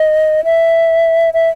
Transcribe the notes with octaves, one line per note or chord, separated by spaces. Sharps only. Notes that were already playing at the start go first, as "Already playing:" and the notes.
Already playing: D#5
E5
E5